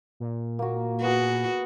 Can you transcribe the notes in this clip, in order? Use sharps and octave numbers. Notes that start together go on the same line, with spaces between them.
A#2
A#3 F#4
B3 F#4 G#4